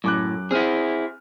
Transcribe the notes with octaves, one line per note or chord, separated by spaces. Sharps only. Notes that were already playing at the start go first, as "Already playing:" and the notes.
F#2 A2 D6 F#6
C4 E4 G#4 F6 D#7